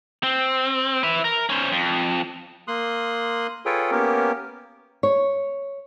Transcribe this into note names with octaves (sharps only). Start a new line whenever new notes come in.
C4
B4 E5
A#4
C#4 C5
F2
A#3 C6 D#6 F#6
F4 G#4 A4 B4 C#5 G5
A#3 B3 C#4 G4 A#4
C#5